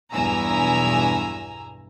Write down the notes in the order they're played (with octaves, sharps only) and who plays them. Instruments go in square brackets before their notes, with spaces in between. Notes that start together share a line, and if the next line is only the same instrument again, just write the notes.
[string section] B1 E2 G2 G#5 A#5 E6